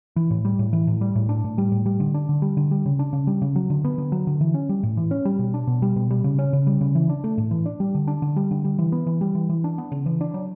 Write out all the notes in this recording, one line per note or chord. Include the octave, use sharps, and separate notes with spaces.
E3
A2
G3
A2
E3
A2
G3
A2
D4
A2
G3
A2
G3
D3
D4
D3
G3
D3
G3
C#3
D4
C#3
G3
C#3
F#3
D3
B3
D3
F#3
D3
E3
C#4
G3
A2
E3
C#4
G3
B2
D4
B2
G3
B2
G3
C#3
C#4
C#3
G3
C#3
E3
D4
A3
A2
E3
D4
G3
D3
D4
D3
G3
D3
G3
E3
B3
E3
G3
E3
E3
D4
B3
C#3
E3
D4
F#3